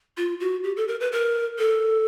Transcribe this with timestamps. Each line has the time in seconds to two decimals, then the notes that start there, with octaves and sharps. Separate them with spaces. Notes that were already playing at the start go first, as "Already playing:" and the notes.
0.17 F4
0.40 F#4
0.64 G4
0.77 A4
0.88 A#4
1.00 B4
1.12 A#4
1.59 A4